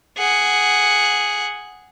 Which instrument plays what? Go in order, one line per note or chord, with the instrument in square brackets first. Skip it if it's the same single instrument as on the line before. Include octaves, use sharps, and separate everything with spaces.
[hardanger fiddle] G#4 F#5